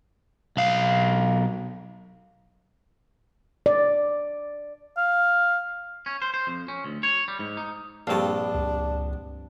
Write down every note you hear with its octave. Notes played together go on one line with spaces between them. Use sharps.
B1 F5
D5
F5
C#4
C5
C5
F2
C#4
D2
C#5
G3
G#2
D#4
A#1 G2 C4 D4 A4 F5
C#2